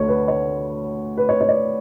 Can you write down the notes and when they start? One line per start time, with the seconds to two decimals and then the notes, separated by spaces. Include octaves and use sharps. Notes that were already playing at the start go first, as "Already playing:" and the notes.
Already playing: D2 D3 C#5
0.08 B4
0.28 C#5
1.18 B4
1.29 C#5
1.41 C#5
1.48 D5